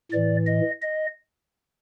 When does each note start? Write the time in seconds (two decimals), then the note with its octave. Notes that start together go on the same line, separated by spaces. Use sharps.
0.12 A2 E3 D5
0.47 D#5
0.82 D#5